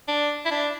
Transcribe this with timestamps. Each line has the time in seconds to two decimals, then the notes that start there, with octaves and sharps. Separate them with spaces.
0.08 D4
0.45 E4
0.51 D4